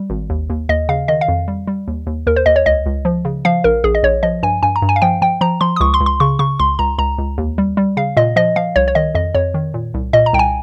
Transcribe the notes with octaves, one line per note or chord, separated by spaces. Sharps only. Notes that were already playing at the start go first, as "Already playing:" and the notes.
Already playing: G3
G#1
D#2
D#2
D#2 D#5
C#3 F5
D#3 D#5
F5
F2
G3
G3
D#2
D#2
D#2 A#4
C5
D#2 D#5
C#5
C#2 D#5
C#2
F3
C#3
F3 F5
A#1 A#4
A#1 G#4
D#5
A#1 C#5
F3 D#5
G2 G#5
G2 G#5
A#5
G2
G#5
F5
F3 G5
F3 G5
F3 A#5
F3 C6
D#6
C#2 C#6
C6
C#2
C6
C#3 C#6
C#3 C#6
C#2 C6
C#2 A#5
C#2 A#5
C#2
D#2
G3
G3
C#3 F5
A#2 D#5
F3 D#5
F3 F5
C2 C#5
C#5
D#3 D#5
F2 D#5
F2 C#5
D#3
A#2
C2
A#2 D#5
A#5
C2 G5
G#5